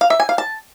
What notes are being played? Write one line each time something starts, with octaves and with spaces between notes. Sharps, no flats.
F5
E5
G#5
F5
A5